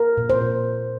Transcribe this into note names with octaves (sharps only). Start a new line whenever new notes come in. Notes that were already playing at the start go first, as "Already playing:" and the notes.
Already playing: A#4
A#2
C5
A#2